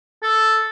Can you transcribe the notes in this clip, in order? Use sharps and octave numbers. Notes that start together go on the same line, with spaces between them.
A4